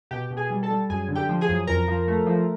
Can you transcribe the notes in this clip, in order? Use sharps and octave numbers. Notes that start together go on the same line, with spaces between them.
B2 G4 G5
B2
G#4 G#5
G3
A4 A5
G3
F#2 G#4 G#5
D3
G4 G5
F3
G#4 G#5
F#2
F2 A#4 A#5
F3
A3
F3